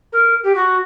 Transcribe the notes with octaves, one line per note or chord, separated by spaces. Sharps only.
A#4
G4
F#4